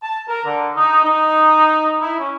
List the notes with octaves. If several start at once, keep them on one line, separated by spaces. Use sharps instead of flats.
A5
A#4
D3
D#4
D#4
E4
C#4